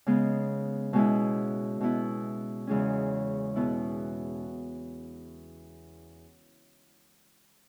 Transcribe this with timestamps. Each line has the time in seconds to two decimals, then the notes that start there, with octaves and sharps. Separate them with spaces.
0.07 C#3 G#3 B3
0.93 B2 G#3 C#4 E4
1.80 B2 B3 E4
2.67 E2 C#3 G#3 C#4
3.56 B2 B3 E4